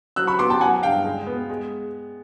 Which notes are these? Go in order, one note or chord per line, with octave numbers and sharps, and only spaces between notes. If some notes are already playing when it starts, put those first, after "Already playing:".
F#3 E6 F#6
B5 C#6
B3 C6 D6
G5 A5
F#3 F#5 G#5
G2 F5 G5
G#3
B3
G#3